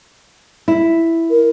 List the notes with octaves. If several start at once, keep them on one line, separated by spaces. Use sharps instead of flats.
E4
A#4